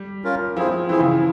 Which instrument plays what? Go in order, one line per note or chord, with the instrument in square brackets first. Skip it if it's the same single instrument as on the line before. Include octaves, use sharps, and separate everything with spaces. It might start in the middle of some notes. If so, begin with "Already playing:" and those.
Already playing: [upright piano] G3
[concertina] C#4 F4 A#4
[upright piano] F3 [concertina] C4 E4 G#4 C5
[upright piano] E3 [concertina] C4 E4 G#4 C5
[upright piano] C#3